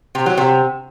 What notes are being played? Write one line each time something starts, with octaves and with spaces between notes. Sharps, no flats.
C3
F#3
C3